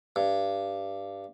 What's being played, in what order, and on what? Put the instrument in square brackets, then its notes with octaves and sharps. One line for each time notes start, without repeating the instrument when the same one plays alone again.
[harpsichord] G2